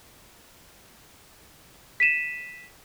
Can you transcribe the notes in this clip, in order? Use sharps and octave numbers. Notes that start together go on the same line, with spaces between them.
B6 D#7 E7